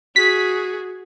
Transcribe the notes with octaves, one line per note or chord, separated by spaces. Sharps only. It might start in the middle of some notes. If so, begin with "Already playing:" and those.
F#4 G#4 B6